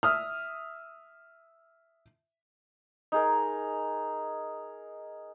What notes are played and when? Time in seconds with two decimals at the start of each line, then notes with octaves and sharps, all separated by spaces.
0.03 E5 D#6 F6
3.12 D#4 G#4 A#4